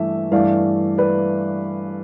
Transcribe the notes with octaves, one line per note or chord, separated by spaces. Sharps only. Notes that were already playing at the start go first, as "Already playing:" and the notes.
Already playing: G2 E3 A3 E5
G2 E3 A3 D5 F5
B4 D5